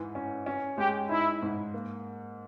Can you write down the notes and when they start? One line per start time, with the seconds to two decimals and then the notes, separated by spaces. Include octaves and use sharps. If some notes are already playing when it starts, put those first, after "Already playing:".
Already playing: G#2 E3
0.15 C#4
0.46 C#4
0.78 G#3 G4
1.09 D#4 E4
1.42 G#2
1.74 A#3